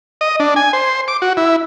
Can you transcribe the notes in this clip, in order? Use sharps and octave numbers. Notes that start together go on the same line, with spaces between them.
D#5
D4
G#5
C5
D6
F#4
E4